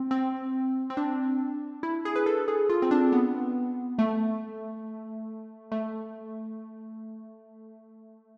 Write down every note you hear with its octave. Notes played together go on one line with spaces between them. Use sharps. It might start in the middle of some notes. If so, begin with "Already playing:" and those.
Already playing: C4
C4
C4
D4
E4
G#4
B4
A4
G#4
F4
C4
D4
B3
A3
A3